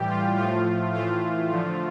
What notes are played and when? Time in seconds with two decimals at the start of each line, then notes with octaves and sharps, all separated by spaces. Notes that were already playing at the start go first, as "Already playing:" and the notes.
Already playing: A2 E3 G3 G4
0.09 F4
0.37 A2 F3 A3 F4
0.94 A2 E3 A3 F4
1.50 D3 F3 A3